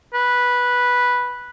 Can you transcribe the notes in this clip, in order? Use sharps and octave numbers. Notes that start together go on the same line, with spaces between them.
B4